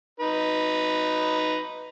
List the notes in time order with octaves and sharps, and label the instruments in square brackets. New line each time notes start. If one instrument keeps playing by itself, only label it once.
[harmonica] D#4 B4